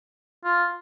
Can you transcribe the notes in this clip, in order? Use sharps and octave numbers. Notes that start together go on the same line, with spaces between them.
F4